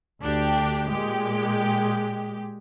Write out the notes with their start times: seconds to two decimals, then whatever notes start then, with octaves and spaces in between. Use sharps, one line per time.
0.21 D2 D4 G4
0.88 A#2 G#3 G4